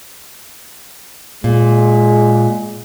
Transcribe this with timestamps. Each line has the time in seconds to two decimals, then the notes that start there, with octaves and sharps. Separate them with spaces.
1.44 A#2 G#3